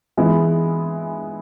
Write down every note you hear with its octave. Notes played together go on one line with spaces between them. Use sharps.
E3 G#3 B3 E4